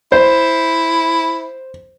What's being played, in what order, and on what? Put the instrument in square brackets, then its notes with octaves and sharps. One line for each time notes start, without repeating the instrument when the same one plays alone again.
[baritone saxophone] E4 [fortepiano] C5